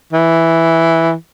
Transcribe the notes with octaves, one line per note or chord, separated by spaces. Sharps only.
E3